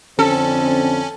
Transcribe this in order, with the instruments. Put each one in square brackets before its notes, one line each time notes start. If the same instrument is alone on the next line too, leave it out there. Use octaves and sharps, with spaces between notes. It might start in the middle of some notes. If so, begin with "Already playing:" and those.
[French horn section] F2 D3 C4 [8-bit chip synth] C#4 [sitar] A4